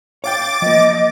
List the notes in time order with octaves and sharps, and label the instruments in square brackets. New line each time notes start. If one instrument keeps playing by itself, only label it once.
[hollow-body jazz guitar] C#5 F5 G5 [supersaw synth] D6 A6
[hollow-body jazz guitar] F3 A#3 [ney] D#5